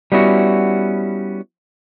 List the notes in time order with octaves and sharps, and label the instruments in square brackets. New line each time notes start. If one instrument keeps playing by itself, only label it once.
[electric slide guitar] G3 B3 C#4 E4 F#4